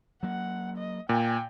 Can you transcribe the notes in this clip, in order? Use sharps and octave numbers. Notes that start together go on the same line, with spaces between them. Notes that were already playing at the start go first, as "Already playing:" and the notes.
F#3 A#3 F#5
D#5
A#2 G5 G#5